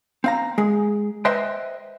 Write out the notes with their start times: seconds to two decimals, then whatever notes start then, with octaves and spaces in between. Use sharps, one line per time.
0.24 C4 F5 A#5
0.58 G#3 G#4
1.25 B4 C5 D#5 E5 G5 C6